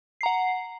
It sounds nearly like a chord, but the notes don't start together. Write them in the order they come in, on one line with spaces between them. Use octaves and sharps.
C7 A#5 F#5